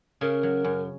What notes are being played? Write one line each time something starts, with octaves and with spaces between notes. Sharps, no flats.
C#3 A#4
F#3
F#2